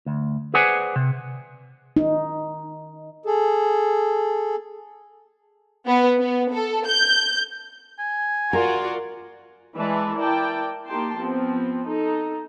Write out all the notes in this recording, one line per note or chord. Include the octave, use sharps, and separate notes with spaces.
D2
G#4 B4 C5 D5 F#5 G#5
C3
D#4
G#4 A4
B3
B3
A4
G6
G#5
F4 F#4 A#4 D5
E3 G#3 B4 D5 E5 A5
E4 A#4 D5 G5 A5
A#3 D#4 G4 G5 A5 C6
F3 B3 C4
D#4 A4